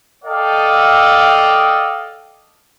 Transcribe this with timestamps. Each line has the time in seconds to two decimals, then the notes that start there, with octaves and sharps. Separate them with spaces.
0.24 A4 D5 D#5 F5 G5